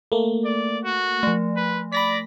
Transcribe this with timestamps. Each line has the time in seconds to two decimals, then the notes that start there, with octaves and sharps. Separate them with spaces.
0.12 A3 A#3
0.45 D5
0.85 F#4
1.23 F3 A3
1.56 B4
1.93 D5 B5 A#6 B6